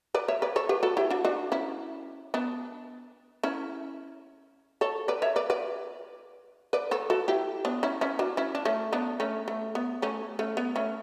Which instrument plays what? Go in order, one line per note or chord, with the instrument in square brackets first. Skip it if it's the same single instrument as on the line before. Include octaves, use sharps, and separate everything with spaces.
[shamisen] B4 D5
C#5 E5
B4 D5
A4 C#5
G4 B4
F#4 A4
E4 G4
D4 F#4
D4 F#4
C#4 E4
B3 D4
C#4 E4
A4 C#5
B4 D5
C#5 E5
B4 D5
B4 D5
B4 D5
A4 C#5
F#4 A4
E4 G4
B3 D4
C#4 E4
C#4 E4
D4 F#4
C#4 E4
D4
A3 C#4
B3 D4
A3 C#4
A3
B3
A3 C#4
A3 C#4
B3
A3 C#4